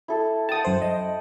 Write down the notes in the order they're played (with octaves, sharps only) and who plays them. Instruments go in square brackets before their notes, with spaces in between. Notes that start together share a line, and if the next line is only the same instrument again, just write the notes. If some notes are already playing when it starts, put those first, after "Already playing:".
[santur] E4 A4
[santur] F#5 G5 [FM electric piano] A5 D#6
[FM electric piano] F#2 C5
D#5